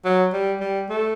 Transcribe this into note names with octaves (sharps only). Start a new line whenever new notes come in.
F#3
G3
G3
A3